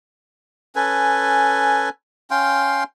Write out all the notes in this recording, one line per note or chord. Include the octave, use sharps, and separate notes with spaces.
C#4 A4 B4 G#5
C#4 F5 G5 C6